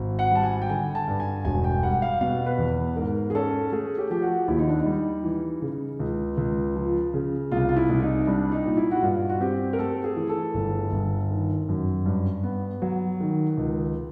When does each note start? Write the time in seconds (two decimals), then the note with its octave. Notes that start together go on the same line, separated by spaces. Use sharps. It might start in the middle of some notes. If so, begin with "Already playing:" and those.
Already playing: G#1
0.19 F#5
0.31 G3 A5
0.43 G#5
0.62 G5
0.69 D3 G#5
0.95 A5
1.08 G2
1.20 G#5
1.45 E1 G#5
1.64 G5
1.83 G3 F#5
2.02 F5
2.21 B2 F5
2.46 B4
2.58 E2
2.72 B4
2.96 G#2 A#4
3.30 G#4
3.35 C#4 A4
3.72 A3 G#4
3.98 G4
4.10 F3 G4
4.22 F#4
4.48 D#2 E4
4.58 D#4
4.68 D4
4.79 D#4
4.86 G3
5.24 E3
5.62 C#3
5.99 C#2
6.37 C#2
6.76 F3
7.14 C#3
7.52 C2 F4
7.69 F4
7.76 E4
7.89 C2
8.02 D#4
8.27 G3 D4
8.52 D#4
8.65 A#2
8.77 E4
8.91 F#4
9.02 G2 F4
9.29 F#4
9.41 C4 G4
9.73 A#4
9.79 A3 A4
10.04 G#4
10.16 E3
10.29 A4
10.54 G1
10.92 G1
11.31 D#3
11.69 F#2
12.06 G2
12.43 B3
12.82 F#3
13.20 D#3
13.57 C#2